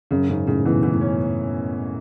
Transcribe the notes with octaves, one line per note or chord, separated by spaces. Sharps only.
F#2 C#3
G#2 C#3
A2 C#3
B2 E3
E3
A2
C#4